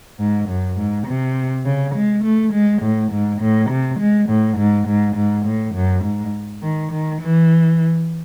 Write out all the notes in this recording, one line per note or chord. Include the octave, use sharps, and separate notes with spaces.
G#2
F#2
G#2
C3
C#3
G#3
A3
G#3
A2
G#2
A2
C3
G#3
A2
G#2
G#2
G#2
A2
F#2
G#2
D#3
D#3
E3